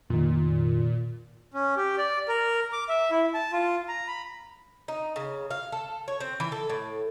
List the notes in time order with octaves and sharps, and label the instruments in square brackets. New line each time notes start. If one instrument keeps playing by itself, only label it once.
[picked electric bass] F1 D#3 [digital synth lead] A#2
[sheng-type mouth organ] C#4
G4
D5
A#4
D6
E5
E4
A5
F4
A#5
B5
[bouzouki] D#4
C#3
F5
A4
C#5
C4
E3
A4
A2